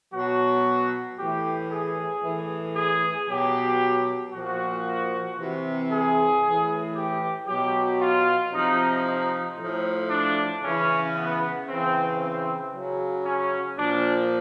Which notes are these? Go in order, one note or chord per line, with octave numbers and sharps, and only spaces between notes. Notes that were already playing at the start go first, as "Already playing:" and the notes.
B2 F#3 F#4
A2 E3 G4
G#4
A2 E3
G#4
B2 F#3 G4
A#2 F3 F#4
C3 E3
G#4
A2 E3
G4
B2 F#3 G4
F4
C3 F3 D#4
D#4
A2 F3
D4
C#3 E3 C#4
B3
C#3 E3 C4
C4
C#3 F#3
C#4
A#2 F3 D4